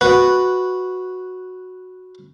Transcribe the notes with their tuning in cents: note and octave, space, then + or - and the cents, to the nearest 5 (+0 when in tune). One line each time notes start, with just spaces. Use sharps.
F#4 -5 B4 +0